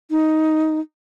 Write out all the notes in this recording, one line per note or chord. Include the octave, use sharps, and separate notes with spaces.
D#4